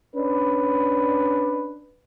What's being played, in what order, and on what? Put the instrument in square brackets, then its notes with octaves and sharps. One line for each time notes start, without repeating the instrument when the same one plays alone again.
[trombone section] C#4 D4 B4